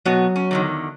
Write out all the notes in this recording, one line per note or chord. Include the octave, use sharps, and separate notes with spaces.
B2 F#3 B3 F#4
C#4
E2 D3 D#3